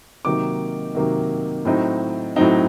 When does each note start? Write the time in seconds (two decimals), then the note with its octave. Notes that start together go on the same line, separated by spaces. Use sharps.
0.25 C3 D#3 F#3 A#3 D#4 D6
0.95 C3 D#3 F#3 A#3 D#4
1.65 A2 F#3 C4 D#4
2.36 A2 F#3 C4 D#4